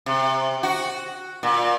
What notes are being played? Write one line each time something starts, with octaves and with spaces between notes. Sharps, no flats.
C3
F#4
A#2